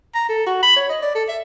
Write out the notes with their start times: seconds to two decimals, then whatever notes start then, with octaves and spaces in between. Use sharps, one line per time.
0.15 A#5
0.29 A4
0.46 F#4
0.62 B5
0.76 C#5
0.89 D#5
1.02 D5
1.15 A4
1.28 E5